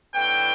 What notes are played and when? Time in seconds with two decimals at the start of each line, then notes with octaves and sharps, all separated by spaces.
0.13 A2 E3 B3 D4 G5